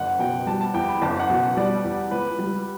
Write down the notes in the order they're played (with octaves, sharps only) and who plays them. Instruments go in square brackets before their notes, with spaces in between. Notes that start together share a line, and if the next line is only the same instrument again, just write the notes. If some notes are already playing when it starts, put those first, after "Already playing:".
Already playing: [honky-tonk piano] F#1 [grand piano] F#5
[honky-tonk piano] B2 [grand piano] G5
[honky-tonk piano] G3 [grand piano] A5
[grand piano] A5
[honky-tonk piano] E2 [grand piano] G5
[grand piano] B5
[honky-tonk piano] F#1 [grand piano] A5
[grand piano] F#5
[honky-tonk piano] B2
[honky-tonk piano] G3 [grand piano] D5
[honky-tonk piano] E2
[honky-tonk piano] C#2 [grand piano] B4
[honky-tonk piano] G3